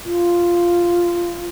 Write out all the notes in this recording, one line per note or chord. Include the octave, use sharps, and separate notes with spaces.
F4